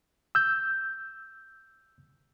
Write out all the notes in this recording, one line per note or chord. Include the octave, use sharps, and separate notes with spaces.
E6 G6